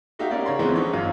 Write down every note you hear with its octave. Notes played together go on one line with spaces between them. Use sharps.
A3 D#4 F#4 G4 E5 F5
C#4 A#4 D5 F5
C#3 C#5 A#5 C6
D3 E3 F3 G#3 B3 C4
C#4 D#4 A4 C#5
G1 F#2 F4